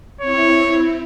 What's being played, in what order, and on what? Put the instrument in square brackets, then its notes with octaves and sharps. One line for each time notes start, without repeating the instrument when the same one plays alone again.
[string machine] C4 E4 [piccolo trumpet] C#5